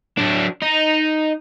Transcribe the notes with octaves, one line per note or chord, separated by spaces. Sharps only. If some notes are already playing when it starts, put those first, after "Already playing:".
F#3 D4
D#4